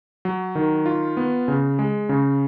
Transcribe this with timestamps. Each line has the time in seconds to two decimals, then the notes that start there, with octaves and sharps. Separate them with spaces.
0.25 F#3
0.55 D#3
0.86 F4
1.17 B3
1.48 C#3
1.79 G#3
2.09 C#3